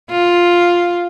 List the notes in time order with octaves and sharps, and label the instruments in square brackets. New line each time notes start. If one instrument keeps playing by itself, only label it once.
[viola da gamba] F4